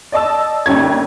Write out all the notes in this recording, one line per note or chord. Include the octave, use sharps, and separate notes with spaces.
D5 D#5 A5 E6
G1 D#2 G3 C#4 G#6